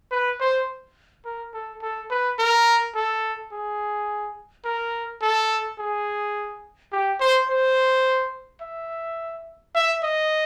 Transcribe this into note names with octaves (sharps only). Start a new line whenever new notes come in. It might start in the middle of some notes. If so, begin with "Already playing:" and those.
B4
C5
A#4
A4
A4
B4
A#4
A4
G#4
A#4
A4
G#4
G4
C5
C5
E5
E5
D#5